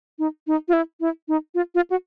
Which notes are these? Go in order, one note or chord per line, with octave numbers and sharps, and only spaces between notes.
D#4
D#4
F4
E4
E4
D#4
F4
F4
F#4